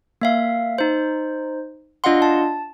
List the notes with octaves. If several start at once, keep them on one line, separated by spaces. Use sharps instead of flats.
A#3 E5 F5
D#4 C5
D4 F4 D#5 F5 F#5 C6
A5